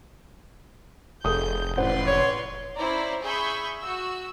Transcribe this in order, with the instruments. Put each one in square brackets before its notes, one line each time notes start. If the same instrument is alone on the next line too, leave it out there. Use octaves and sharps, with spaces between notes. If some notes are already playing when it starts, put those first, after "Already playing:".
[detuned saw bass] F1 [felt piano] G#4 A4 D#6 [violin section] G6
[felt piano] A1 C5 F#5 [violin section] B4 D5 C6
[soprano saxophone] C#5
[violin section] C#4 E4 C5 D5 A#5
G#4 E5 B5 C#6 G6
F#4 E6